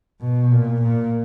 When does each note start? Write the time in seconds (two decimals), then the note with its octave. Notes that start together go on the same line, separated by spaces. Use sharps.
0.21 B2
0.51 A#2
0.82 A#2